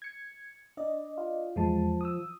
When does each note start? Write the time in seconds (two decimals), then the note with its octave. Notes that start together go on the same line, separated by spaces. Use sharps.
0.02 G#6 C#7
0.77 D4 D5 D#5
1.18 F4
1.56 E2 F3 G#3 A5
2.01 D#6 E6